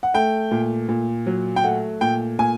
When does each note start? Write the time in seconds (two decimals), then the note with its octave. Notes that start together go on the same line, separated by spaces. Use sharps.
0.03 F#5
0.14 A3 G5
0.51 A#2
0.89 A#2
1.26 F#3
1.56 G5
1.64 A3 F#5
2.01 A#2 G5
2.39 A#2 G#5